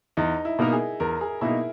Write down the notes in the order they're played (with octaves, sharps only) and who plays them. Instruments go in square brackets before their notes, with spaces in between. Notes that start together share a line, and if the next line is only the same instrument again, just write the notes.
[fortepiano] E2 [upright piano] D#4
[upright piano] E4
[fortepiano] B2 A#3 D#4 A#4
[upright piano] G#4
[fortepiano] E2 [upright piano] A#4
[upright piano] G#4
[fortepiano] B2 A#3 D#4 A#4 [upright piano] E4